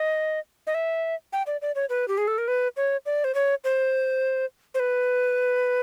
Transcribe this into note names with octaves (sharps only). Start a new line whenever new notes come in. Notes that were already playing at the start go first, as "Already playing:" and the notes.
Already playing: D#5
D#5
E5
G5
D5
D5
C#5
B4
G4
G#4
A4
A#4
B4
C#5
D5
C5
C#5
C5
C5
B4